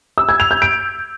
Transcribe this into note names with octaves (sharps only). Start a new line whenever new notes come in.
E6
G#6
F7
G6
D7